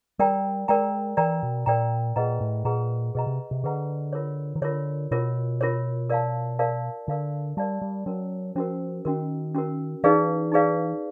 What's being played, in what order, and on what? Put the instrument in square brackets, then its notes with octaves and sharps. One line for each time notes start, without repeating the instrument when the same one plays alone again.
[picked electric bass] G3 [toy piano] A#4 D5 G5 A#5
[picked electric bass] G#3 [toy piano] A#4 D5 G5 A#5
[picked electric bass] E3 [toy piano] A#4 D5 G5 A#5
[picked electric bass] B2
[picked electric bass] A#2 [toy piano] A#4 D5 G5 A#5
[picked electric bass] A#2 [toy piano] G#4 B4 D#5 F#5 A#5
[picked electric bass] A2
[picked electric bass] A#2 [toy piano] G#4 B4 D#5 F#5 A#5
[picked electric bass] B2 [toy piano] G#4 B4 D#5 F#5 A#5
[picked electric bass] C3
C3
[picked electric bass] D3 [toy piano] G#4 B4 D#5 F#5 A#5
[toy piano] F4 A#4 C#5
[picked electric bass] D#3
[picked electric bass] D3 [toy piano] F4 A#4 C#5
[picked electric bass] B2 [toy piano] F4 A#4 C#5
[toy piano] F4 A#4 C#5
A#4 D5 F5 A5
A#4 D5 F5 A5
[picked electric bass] D3 [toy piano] A#4 D5 F5 A5
[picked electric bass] G3 [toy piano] A#4 D5 F5 A5
[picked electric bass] G3
[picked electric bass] F#3 [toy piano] C#4 F#4 A#4
[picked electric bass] F3 [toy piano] C#4 F#4 A#4
[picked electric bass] D#3 [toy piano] C#4 F#4 A#4
[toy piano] C#4 F#4 A#4
[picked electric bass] E3 [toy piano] D#4 G#4 B4 D5 F5
[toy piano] D#4 G#4 B4 D5 F5